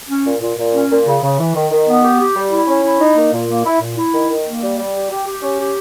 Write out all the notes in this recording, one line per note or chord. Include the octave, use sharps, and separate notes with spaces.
C#4
A#2
A#2
A#2
C#4
A#2
C#3
C#3
E3
D#3
D#3
B3
G4
G4
G3
E4
C#4
E4
D#4
A#3
A#2
A#3
E4
A#2
E4
D#3
D#3
A#3
G3
G3
G4
G4
G4
C#4
G4